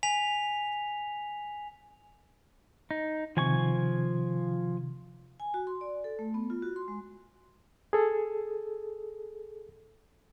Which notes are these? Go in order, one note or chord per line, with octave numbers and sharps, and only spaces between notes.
G#5 B6 F7
D#4
C3 D#3 F3 G#5 C#6
G#5
F#4
C6
D5
A4
A3
B3
F4
F#4
C6
G#3
G#4 A4